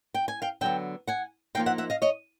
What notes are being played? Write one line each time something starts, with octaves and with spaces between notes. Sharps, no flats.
G5
G#5
F5 G5
D3 F#3 B3 G5 A5
F#5 G#5
F3 A#3 D#4 F5 G5
E5 F#5
E5 F#5
D#5 F5
C#5 D#5